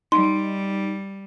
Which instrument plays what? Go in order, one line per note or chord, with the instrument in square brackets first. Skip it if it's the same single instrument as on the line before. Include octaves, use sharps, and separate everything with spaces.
[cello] G3 [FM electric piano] D#4 [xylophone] C6